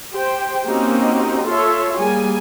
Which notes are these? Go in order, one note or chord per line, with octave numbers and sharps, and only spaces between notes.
G4 C5 G5
A#3 C4 C#4 D#4 F#4 G4
F4 A4 C#5 E5 C6
G3 A#3 G#4 G#5